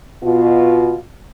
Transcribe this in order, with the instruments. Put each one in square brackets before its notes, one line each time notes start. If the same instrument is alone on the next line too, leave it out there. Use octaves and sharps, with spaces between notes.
[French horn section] B2 F4